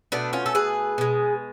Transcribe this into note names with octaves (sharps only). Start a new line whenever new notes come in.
B2 A3 B3 D4
C#4 F4
A4
G#4 B4
B2 G#3